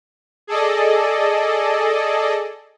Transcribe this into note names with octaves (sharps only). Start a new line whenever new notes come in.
G#4 A4 D5 D#5